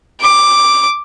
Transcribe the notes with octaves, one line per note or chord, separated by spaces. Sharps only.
D6